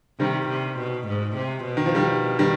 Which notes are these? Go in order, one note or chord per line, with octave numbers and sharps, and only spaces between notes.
C3 D#3 G3
C3
B2
G#2
C3
B2
D#3
F3
D#3 G3
D#3 G3